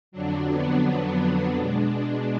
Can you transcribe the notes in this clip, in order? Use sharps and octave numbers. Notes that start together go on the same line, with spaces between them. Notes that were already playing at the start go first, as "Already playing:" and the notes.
F2 D3 F#3 D4
B3
B3
D4
B2 G#3 D4
D4